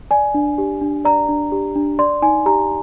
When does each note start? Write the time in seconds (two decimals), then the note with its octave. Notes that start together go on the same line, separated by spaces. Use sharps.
0.11 D5 G#5
0.34 D4
0.58 G4
0.81 D4
1.05 D5 A#5
1.29 D4
1.52 G4
1.75 D4
1.99 D5 C6
2.22 D#4 G#5
2.46 G4 A#5